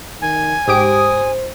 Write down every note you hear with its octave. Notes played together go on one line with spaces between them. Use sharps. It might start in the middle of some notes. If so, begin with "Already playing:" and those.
D#3 G#5
G#2 G4 C5 D#6 D7